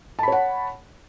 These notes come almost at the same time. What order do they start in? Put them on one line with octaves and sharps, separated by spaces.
A5 B5 C#5 F#5